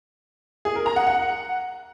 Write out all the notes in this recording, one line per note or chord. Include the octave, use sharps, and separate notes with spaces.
G#4
A#4
A#5
F#5
F#5